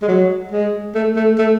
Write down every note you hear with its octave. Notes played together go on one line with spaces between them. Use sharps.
G#3
F#3
G#3
A3
A3
A3